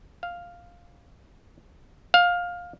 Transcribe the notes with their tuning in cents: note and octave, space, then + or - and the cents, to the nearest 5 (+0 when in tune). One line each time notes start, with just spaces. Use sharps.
F5 +0
F5 +15